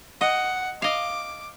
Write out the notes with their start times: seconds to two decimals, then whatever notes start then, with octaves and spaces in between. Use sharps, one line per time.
0.21 D#5 F#5
0.82 D#5 F5 D6